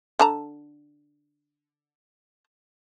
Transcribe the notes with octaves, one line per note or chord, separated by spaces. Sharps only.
D3 A5 A#5